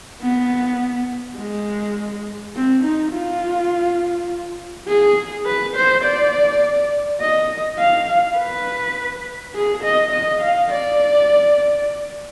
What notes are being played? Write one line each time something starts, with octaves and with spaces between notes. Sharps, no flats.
B3
G#3
C4
D#4
F4
G#4
B4
C5
D5
D#5
F5
B4
G#4
D#5
D#5
F5
D5